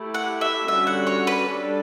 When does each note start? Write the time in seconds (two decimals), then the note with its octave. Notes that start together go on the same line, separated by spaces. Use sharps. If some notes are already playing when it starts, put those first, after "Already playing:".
Already playing: A3 E4 G4
0.14 F#5
0.41 E5
0.68 D3 G3 C#4 F#4 E5
0.87 F#5
1.07 C#5
1.27 B4
1.47 G3 D4 A4